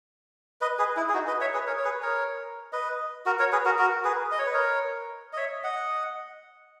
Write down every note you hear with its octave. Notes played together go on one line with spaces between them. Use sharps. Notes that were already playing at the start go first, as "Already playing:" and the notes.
B4 D#5
G#4 B4
E4
G#4
D#4 F#4
B4 D#5
C#5 E5
G#4 B4
A#4 C#5
C#5
G#4 B4
A#4 C#5
B4 D#5
F#4 A#4
A#4 C#5
G#4 B4
F#4 A#4
F#4 A#4
G#4 B4
D#5
C#5
B4
A#4 C#5
D#5
C#5 E5
D#5 F#5